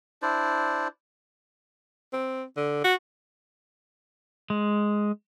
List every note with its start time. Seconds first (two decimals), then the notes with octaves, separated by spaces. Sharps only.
0.22 D4 E4 C5 D5
2.13 C4
2.57 D3
2.84 F#4
4.50 G#3